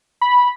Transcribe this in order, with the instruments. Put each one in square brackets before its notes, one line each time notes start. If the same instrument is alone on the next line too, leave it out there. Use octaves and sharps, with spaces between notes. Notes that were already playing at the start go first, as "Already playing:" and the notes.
[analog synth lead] B5